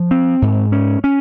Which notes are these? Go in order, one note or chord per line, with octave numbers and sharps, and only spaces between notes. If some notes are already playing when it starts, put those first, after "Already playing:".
Already playing: F3
C4
G#2
C#4
C#4